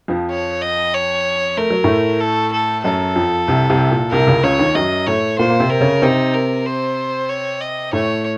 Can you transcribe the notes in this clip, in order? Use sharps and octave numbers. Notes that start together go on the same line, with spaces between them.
F2 F3
C#5
D#5
C#5
A3 A#4
F#3
A2 A3
A4
A4
F#2 F#3 A4
F2 F3
C2 C3
C2 C3
A#2
C2 C3 A#4
C#2 C#3
C#2 C#3 C#5
D#2 D#3
F#2 F#3 D#5
A2 A3 C#5
A#2 A#3 C5
A#3
C3 C4
A#4
C#3 C#4
C3 C4 D#4
A#4
C5
C#5
D#5
A2 A3 C#5